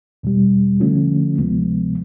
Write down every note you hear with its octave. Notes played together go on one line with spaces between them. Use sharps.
E2 B2 G3
D3 F3 A3 C#4 F4
D2 C3 F3 G#3 B3